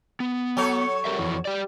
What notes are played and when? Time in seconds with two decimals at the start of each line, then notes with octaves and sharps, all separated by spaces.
0.20 B3
0.57 F#3 A4 C#5
1.05 G4 A#4 E5
1.18 F2 E3
1.45 G4 D5